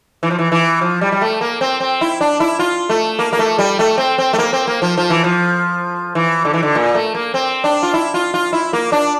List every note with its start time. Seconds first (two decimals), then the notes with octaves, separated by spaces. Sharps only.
0.23 E3
0.31 F3
0.39 E3
0.52 E3
0.81 F3
1.01 G3
1.12 G3
1.21 A3
1.41 A#3
1.61 C4
1.80 C4
2.01 E4
2.21 D4
2.40 E4
2.59 F4
2.89 A3
3.19 A#3
3.33 A#3
3.39 A3
3.59 G3
3.79 A3
3.98 C4
4.18 C4
4.33 A3
4.38 A#3
4.53 C4
4.67 A#3
4.82 F3
4.98 F3
5.10 E3
5.24 F3
6.15 E3
6.45 D3
6.54 E3
6.63 D3
6.75 A#2
6.95 A3
7.15 A#3
7.34 C4
7.64 D4
7.83 F4
7.94 E4
8.14 F4
8.34 F4
8.53 E4
8.73 A#3
8.92 D4